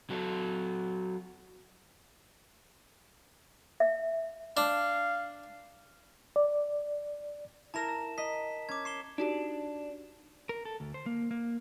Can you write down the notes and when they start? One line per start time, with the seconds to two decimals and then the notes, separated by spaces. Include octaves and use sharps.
0.10 F#3 A4
3.80 E5
4.57 D4 F5
6.36 D5
7.74 E4 A#4 A5 A#5 A#6 E7
7.88 A#6
8.18 D#5 B6
8.69 C#4 D6 G#6
8.85 C#6 C7 E7 G7
9.18 D4 D#4 F#4 G4
10.49 A#4
10.65 A4
10.80 D2
10.94 C5
11.06 A#3
11.31 A#3